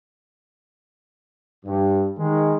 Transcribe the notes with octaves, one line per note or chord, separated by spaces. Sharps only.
G2
D#3 G#3